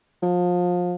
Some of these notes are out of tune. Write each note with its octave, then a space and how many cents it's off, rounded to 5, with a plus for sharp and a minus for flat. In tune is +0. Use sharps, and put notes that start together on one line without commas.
F3 +30